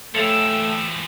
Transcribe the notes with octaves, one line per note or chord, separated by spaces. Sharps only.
E3 F3 A3 A4 C#5 F5 G5 E6